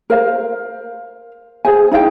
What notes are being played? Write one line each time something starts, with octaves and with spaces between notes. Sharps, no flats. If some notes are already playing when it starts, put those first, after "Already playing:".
A#4 C5 F5
G#4 C5 G#5
D#4 E4 F5 G5